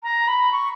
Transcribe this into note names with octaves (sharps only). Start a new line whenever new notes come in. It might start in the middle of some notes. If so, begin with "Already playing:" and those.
A#5
B5
C#6